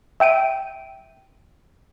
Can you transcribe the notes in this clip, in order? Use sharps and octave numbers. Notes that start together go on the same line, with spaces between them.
E5 G5 D7 D#7